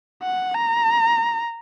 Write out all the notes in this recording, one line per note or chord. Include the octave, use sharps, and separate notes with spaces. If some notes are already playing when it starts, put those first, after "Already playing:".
F#5
A#5